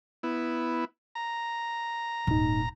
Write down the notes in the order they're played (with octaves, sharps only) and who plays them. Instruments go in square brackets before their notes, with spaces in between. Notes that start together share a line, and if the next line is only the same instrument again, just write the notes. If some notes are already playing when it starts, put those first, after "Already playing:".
[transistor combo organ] B3 E4
A#5
[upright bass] D#1 [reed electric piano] G#2 D#4